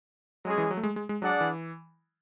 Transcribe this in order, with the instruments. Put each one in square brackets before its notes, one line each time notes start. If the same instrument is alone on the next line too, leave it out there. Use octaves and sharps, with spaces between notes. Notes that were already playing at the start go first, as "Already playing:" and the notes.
[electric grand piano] F#3 [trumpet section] G#3 C#4 G#4
[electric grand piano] E3
F#3
A3
G#3
G#3
G#3
[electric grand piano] F#3 [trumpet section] D4 G#4 D5 F#5
[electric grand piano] E3